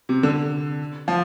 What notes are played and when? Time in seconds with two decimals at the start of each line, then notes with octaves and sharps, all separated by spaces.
0.09 C3
0.23 D3
1.08 F3